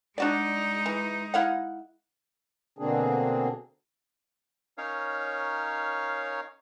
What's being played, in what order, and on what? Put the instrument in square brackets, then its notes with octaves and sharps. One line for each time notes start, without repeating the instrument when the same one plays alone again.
[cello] G#3 D#4 [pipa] D4 F#4 D5
[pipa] E3
E4 F5 F#5
[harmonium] B2 D3 A#3 C4 D4 G#4
[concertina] C#4 D#4 A#4 C#5 F5